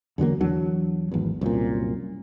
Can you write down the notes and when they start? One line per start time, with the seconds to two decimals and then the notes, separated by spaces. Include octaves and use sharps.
0.18 E2 D3 F#3 A#3
0.41 E2 F#3 D4
1.12 G#1 E2
1.41 C2 F#2 A#2